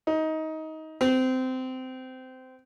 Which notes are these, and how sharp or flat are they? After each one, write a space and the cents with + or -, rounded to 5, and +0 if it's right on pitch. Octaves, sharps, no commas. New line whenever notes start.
D#4 +20
C4 -20